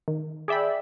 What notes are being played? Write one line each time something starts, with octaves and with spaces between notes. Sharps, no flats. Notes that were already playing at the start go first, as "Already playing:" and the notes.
D#3
G#4 D5 E5 G5 B5